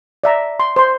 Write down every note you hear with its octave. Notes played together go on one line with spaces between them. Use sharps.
D5 E5 A#5
C6
C5 C6